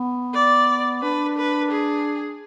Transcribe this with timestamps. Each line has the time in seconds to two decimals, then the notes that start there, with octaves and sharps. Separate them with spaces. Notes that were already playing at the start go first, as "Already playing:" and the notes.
Already playing: B3
0.33 D5
1.02 D4 B4
1.37 B4
1.71 G#4